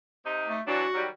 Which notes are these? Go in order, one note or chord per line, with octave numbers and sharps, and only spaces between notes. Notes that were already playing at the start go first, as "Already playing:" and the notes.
C3 D#4
A3
E3 F#3 D4 F#4
D#3 F#3 G3